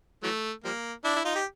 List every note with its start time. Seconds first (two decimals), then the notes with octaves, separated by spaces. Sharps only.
0.23 E3 F#3 A3
0.64 F3 G3 A#3
1.04 D4 E4
1.16 E4
1.25 D#4 F4
1.35 G4